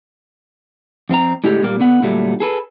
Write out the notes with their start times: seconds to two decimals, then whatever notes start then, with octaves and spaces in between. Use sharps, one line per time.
1.09 F2 C4 E4 A#5
1.44 A2 D3 G#3 G4
1.63 A#2 G3 A#3
1.80 D3 B3 F#5
2.02 A#2 D3 F#3 G3 A3
2.40 G#4 A4 B4